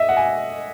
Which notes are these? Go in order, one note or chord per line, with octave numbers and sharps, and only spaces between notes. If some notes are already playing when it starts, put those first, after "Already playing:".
Already playing: D#5 E5
F#5
G#5